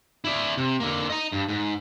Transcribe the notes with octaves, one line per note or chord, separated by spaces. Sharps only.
E4 D5
C3
D3 A#3
D#5 A#5
G2
G#2